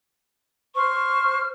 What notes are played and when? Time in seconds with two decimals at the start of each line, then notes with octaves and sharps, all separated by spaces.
0.75 C5 C#6 F6